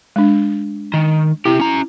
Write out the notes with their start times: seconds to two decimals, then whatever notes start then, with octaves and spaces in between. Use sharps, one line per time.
0.16 G#3 D4
0.94 D#3
1.45 C3 E4 G4
1.60 C#4 A#5